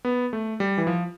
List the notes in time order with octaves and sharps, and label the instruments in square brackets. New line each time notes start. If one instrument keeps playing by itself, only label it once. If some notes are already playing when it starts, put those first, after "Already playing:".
[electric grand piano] B3
A3
G3
E3
F3